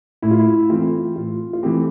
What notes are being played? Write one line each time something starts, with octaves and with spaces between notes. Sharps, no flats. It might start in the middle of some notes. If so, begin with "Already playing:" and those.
A2 E4
F4
E4
E3 A3 C4 F4
A2 F4
F4
E3 A3 C4 G4